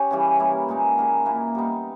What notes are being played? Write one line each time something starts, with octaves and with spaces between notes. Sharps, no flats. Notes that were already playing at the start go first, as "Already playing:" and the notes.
Already playing: C#4 G4
C#3 E3 G3
G3 A#3 E4
A#2 G#3 D#4 A#4
D#3 A#3 E4 G#4
A#2 A#3 E4
G3 B3 D#4